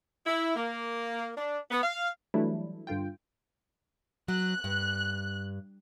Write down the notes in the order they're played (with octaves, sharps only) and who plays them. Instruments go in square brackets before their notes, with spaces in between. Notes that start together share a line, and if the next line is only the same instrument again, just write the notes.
[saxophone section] E4
A#3
D4
B3
F5
[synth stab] E3 F#3 G3 A3 D4 E4
G2 D3 F4 G5
[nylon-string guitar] F#3 [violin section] F#6
[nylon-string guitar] G2